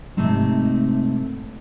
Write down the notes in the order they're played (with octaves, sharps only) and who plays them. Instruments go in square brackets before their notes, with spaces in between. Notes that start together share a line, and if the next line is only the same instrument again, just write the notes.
[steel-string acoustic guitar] G#2 C3 A3 C4 D#4